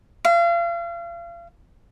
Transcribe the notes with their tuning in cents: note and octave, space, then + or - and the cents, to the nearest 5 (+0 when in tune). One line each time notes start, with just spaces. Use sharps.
F5 -35